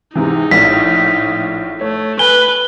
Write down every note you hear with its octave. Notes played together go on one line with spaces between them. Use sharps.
G#2 C3 E3 D#4
A#1 A2 F4 B6
A3 C#5
B4 G#5 G7